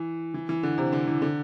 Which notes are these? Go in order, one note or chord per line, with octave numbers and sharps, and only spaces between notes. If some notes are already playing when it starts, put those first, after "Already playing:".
Already playing: E3
E3
E3
D3
C3
D3
E3
D3